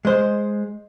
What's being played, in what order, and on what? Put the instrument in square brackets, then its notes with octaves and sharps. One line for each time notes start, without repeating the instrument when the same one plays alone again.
[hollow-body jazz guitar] G#3 C5